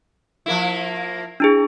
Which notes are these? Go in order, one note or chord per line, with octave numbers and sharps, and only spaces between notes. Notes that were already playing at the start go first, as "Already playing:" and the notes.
F3 A#3 E4
D4 E4 G#4